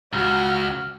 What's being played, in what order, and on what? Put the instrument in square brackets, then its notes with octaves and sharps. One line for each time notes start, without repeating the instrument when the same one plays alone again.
[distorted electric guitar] C#2 [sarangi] F#4 [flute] F6